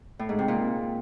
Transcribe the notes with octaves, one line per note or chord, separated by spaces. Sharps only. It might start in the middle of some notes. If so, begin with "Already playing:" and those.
A2
G#2
C3
A#2